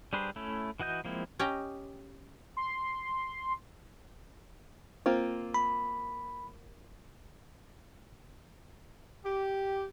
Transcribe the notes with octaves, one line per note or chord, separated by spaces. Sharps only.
G3 D4 G#4 B4 C5
A3 C#4 E4
E3 F#4 D#5 G6
F3 G#3 A#3 C4 E4
C#4 G4 D#5 G5 A#5
C6
A#3 C4 F4
B5
G4